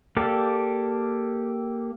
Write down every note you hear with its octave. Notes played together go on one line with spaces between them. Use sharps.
A#3 G4 A4 D5 F5